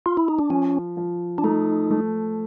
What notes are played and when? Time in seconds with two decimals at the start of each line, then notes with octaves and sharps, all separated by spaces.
0.06 F4
0.17 E4
0.28 D#4
0.39 D4
0.50 F3 C#4
0.97 F3
1.38 D4
1.44 A3 D#4
1.91 A3